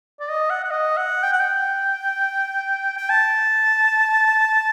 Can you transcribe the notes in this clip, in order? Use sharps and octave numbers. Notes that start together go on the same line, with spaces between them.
D5
D#5
F#5
F#5
D#5
F#5
G5
F#5
G5
G5
A5